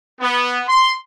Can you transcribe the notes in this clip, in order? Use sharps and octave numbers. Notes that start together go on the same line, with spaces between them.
B3
C6